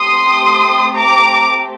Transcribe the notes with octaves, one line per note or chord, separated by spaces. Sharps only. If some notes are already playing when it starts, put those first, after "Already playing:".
Already playing: A3 C4 G4 C6 D#6
A#5 D6